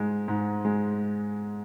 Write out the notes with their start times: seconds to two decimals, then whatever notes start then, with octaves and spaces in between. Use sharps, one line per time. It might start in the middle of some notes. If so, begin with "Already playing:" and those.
Already playing: G#2 G#3
0.28 G#2
0.65 G#3